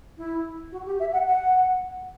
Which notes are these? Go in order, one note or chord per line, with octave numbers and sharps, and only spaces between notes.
E4
F#4
G4
E5
F#5
F#5